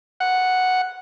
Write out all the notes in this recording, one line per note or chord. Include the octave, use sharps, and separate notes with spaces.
F#5